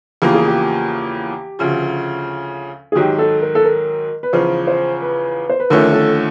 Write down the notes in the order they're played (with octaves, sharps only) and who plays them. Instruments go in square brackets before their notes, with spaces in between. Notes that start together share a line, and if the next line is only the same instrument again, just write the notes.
[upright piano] E2 C#3 F3 A#3 [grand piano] G4
[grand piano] G#4
G4
[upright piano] D2 C#3 F3
[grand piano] G#4
[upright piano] G#2 D#3 F#3 [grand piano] G4
[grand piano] A4
A#4
A4
A#4
B4
[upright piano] E2 C#3 F3 [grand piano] C5
[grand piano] C5
B4
C5
B4
[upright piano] D#2 D3 F3 A3 C#4 [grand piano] A#4
[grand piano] A4